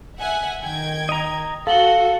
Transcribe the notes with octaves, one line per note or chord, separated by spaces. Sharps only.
E5 F#5 G#5
D#3 G5 G#6
D#5 A#5
F#4 A4 F5 F#7 G7